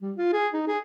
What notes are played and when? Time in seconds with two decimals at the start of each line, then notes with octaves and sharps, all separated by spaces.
0.02 G3
0.16 F4
0.33 G#4
0.54 D#4
0.67 G#4